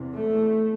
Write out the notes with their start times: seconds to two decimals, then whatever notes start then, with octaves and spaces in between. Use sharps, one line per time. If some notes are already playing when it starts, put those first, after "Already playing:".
Already playing: E2 C3
0.14 A3